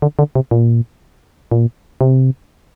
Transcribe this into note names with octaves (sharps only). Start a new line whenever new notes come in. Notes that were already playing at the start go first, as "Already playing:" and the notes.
D3
D3
C3
A#2
A#2
C3